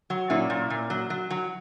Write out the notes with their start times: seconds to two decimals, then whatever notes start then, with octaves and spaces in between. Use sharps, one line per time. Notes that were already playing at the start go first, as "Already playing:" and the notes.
0.10 F#3
0.30 A#2 C#4 E4
0.50 A#2
0.70 A#2
0.90 F#3
1.10 F#3
1.30 F#3